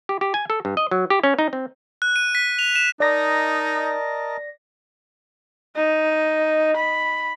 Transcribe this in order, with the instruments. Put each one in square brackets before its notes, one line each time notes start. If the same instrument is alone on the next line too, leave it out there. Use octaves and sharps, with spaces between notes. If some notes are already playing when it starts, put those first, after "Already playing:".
[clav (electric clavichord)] G4
G4
G#5
A4
G2
D#5
F#3
G4
C#4
D#4
C4
[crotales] F#6
D#7
B6
F7
E7
[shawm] D#4 [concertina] A#4 D#5 A5 [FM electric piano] D5 A#6
[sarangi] D#4
B5